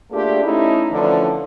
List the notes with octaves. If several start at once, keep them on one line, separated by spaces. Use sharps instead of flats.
A3 A#3 D4 F4 G4 G#4
A3 C#4 D#4 E4
D3 E3 F3 A3 C#4 D4